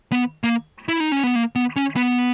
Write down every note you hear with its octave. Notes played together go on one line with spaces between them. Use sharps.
B3
A#3
E4
D#4
C#4
B3
A#3
B3
C#4
B3